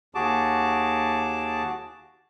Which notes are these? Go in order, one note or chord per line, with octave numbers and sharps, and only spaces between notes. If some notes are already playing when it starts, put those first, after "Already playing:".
D#2 F#4 G#4 A5 D6